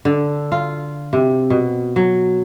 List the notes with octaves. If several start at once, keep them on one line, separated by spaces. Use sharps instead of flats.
D3
F4
C3
B2
F#3